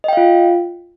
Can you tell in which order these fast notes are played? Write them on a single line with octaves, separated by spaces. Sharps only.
D#5 G5 F5 F4